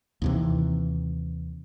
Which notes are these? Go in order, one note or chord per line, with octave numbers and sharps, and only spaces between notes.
D#2 C3 E3